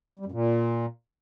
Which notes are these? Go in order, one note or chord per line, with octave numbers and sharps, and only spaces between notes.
G3
F#2
A#2